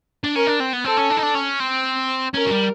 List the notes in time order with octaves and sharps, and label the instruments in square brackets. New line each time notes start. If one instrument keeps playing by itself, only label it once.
[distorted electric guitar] D4
[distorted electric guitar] C#4 [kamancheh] A#4
[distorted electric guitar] D4
C4
B3
[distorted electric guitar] C4 [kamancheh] A4
[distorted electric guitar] C#4
D4
D#4
D4
C#4
C4
[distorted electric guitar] C#4 [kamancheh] A#4
[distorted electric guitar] F#3
G3